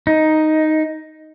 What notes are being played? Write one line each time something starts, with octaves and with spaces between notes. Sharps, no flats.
D#4